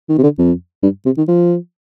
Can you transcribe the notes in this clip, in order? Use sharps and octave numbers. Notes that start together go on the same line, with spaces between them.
D#3
C3
D3
F2
G2
C3
D#3
F3